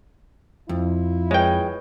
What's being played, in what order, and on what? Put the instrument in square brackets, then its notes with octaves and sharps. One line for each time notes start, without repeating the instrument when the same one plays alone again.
[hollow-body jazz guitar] F2 [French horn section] E4 F4
[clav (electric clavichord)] G#3 G5 [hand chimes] B4 C#5